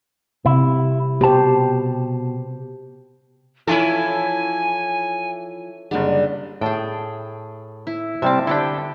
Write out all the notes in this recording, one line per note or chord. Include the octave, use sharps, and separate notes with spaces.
C3 E4
B2 G4 C5 A5
E3 F3 C#4 E4 A4 G#5
F#1 D3 G3 D4
A2 G#4 G5 A5
E4
C3 G3 C4 A5 D6
D3 D4 E4 G4 G5